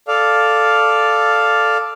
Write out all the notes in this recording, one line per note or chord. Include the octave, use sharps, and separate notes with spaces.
A4 D5 F5